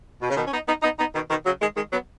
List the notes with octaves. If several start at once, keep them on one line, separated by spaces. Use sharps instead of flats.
B2
C#3
B2 D#3
C#4
B3 D#4
B3 D#4
B3 D#4
B3 D#4
B2 D#3
B2 D#3
C#3 F#3
D#3 G#3
D#3 G#3
F#3 B3